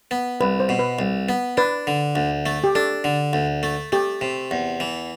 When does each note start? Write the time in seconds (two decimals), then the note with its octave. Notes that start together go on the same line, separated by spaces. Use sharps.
0.11 B3
0.41 C2 B4
0.60 C5
0.69 B2
0.79 B4
0.99 C2
1.29 B3
1.57 D4 B4
1.87 D3
2.16 D2
2.46 A3
2.64 G4
2.75 D4 A4
3.04 D3
3.33 D2
3.63 A3
3.92 A3 G4
4.21 C3
4.51 E2
4.80 E3